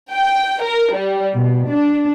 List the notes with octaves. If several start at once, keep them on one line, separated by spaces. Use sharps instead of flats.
G5
A#4
G3
B2
D4